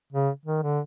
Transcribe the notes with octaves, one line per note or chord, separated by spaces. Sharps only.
C#3
D#3
D3